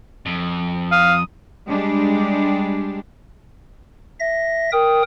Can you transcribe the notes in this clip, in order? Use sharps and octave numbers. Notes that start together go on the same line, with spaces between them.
F2
F5 D#6
G3 G#3 D4 G4
E5 A#6
A#4 G5 D#6